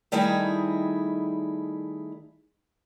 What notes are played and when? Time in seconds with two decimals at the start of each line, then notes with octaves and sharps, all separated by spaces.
0.12 D#3 G3 A3 D#4 E4 G#4